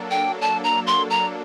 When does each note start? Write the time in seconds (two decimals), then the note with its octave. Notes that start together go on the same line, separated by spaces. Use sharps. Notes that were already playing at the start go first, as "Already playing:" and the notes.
Already playing: F#3 A#3 D4 A4
0.11 G5
0.41 A5
0.64 A#5
0.87 C6
1.10 A#5